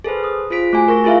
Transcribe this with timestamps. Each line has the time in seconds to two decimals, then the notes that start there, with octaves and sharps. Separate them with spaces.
0.04 G#4 A4 B4 C5
0.24 D#6
0.50 F4 G#4 C5 B6 D7
0.73 A3 F#4 G#5
0.88 A#4 C#6 A#6
1.04 E4 F4 G#4 E5 F5